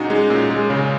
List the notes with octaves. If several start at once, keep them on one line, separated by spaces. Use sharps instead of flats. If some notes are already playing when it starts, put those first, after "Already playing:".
Already playing: A#2 G#3 C#4 D#4 F#4
G#3
A#2
G#3
C#3